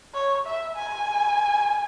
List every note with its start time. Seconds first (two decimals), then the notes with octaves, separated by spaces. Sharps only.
0.14 C#5
0.46 E5
0.77 G#5